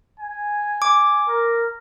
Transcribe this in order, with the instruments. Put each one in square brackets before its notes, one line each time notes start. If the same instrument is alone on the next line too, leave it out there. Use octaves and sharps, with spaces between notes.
[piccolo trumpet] G#5
[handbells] D6
[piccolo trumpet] A#4